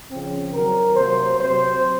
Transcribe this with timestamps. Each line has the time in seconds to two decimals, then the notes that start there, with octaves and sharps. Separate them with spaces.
0.10 C#3 F3 C4
0.53 D#3 F#3 C4 A#4
0.96 C3 F#3 A#3 C5
1.39 C3 F#3 C4 C5